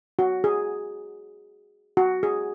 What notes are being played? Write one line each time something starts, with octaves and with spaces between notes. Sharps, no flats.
F#4
G#4
F#4
G#4